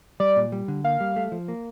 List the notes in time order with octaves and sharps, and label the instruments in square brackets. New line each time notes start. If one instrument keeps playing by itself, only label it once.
[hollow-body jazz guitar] G3 [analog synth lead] D5
[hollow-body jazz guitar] A#2
G3
D3
[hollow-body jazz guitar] A#3 [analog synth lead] F5
[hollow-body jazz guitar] G3
A3
F3
A#3